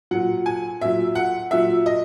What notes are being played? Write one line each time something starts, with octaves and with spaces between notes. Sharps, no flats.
A#2 F#3 F#5
G#5
A#2 F#3 E5
F#5
A#2 F#3 E5
D#5